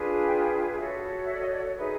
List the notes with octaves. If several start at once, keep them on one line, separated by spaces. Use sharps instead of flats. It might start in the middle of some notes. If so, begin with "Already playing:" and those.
Already playing: D4 F4 G#4 B4
G5
G5
F5
F#4 A4 C#5 E5
E5
D5
D#5
D5
D#4 G#4 B4 E5